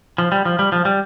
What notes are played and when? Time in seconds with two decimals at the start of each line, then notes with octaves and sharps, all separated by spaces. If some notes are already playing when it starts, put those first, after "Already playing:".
0.18 F3
0.32 G3
0.45 F3
0.59 G3
0.72 F3
0.85 G3